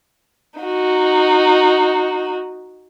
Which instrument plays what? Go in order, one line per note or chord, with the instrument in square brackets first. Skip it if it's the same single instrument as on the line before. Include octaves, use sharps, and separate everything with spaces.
[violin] D#4 F#4